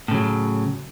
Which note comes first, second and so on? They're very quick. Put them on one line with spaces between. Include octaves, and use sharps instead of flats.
A2 C#3 F#3